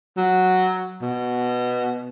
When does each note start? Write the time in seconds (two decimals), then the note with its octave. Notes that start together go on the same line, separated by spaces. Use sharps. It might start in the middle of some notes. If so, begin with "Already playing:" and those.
0.17 F#3
1.02 B2